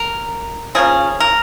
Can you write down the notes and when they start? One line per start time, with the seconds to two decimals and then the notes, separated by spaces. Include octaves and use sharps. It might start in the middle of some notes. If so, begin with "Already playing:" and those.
Already playing: A#4
0.75 C#3 F3 A#3 C#4 G#4
1.20 A#4